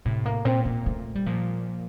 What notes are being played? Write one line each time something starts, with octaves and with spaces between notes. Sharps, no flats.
A2 C3 A3
A#3
A#2 C4
A#3
A3
G3
A#2 F3